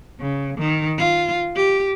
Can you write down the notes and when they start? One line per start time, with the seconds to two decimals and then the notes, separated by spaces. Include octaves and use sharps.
0.20 C#3
0.58 D#3
0.98 F4
1.56 G4